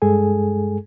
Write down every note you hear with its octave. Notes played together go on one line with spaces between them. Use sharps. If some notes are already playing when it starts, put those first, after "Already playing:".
G2 G#3 G#4 A4 G#5